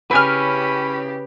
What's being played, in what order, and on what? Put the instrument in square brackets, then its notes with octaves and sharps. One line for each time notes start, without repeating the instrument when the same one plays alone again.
[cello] C#3 G4 [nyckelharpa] C#4 B5 [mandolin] E4 G#5 F6 [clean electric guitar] B4